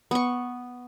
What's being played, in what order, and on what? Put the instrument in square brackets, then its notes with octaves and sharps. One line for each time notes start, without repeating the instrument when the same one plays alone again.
[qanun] B3 C#6